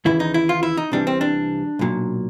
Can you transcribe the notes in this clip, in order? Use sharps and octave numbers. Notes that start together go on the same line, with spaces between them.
D#2 C#3 E3 E4
D#4
E4
F4
E4
D#4
C2 C3 E3 G3 D4
C4
D4
B1 A#2 F#3